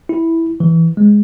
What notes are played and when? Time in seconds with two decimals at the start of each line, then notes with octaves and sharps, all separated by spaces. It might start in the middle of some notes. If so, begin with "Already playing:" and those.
0.09 E4
0.60 E3
0.97 G#3